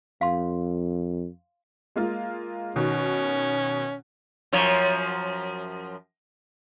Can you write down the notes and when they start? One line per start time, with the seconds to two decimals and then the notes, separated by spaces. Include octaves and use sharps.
0.21 F2 F5 C6
1.96 G#3 A#3 F4
2.76 B2 D#3 C#4
4.53 F#2 F3 C#5